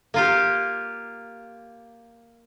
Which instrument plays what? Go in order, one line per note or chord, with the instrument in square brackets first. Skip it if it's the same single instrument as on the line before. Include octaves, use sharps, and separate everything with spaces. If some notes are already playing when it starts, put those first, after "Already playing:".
[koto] A#3 F4 G4